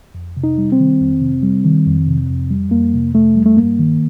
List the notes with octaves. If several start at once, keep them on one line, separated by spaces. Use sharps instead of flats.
F2
C3
D#4
G3
C4
D#3
F2
C3
G3
D#3
F2
C3
F2
G3
F2 A#3
C3
F2 A3
G3
A3
G2 A#3
D#3